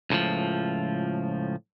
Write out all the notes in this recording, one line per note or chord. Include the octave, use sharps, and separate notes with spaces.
C#2 A2 D3 F3